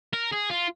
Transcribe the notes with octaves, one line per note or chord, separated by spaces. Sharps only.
A#4
G#4
F4